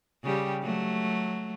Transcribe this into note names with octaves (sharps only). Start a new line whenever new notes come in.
C#3 G3 G4
F#3 A3